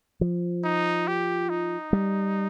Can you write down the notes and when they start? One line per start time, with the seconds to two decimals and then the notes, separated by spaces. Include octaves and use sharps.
0.21 F3
0.64 D#4
1.08 G4
1.49 D#4
1.93 G3